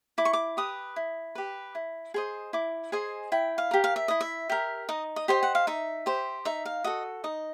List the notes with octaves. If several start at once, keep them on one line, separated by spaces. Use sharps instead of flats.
E4 D6
C#6
D6
G4 B4 D#6
E4
G4 B4
E4
G#4 C5 D#5
E4 D6
G#4 C5 D#5 G#5
E4 G5
F5
G4 A#4
F5
E5
E4 D#5
E5
G4 A#4
D#4 D#5
D#5
G4 C5 G5
F#5
F5
D#4 E5
G4 C5
D#4 E5
F5
F#4 A4 D#5
D#4 D#5